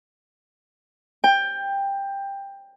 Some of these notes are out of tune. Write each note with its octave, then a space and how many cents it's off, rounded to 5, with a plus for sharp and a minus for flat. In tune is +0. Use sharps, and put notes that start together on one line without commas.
G5 +15